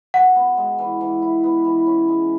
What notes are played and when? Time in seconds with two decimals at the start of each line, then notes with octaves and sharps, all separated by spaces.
0.14 F#4 F#5
0.36 B3
0.57 G#3
0.78 E3
1.01 E3
1.22 E4
1.44 B3
1.65 E3
1.86 C#4
2.08 G#3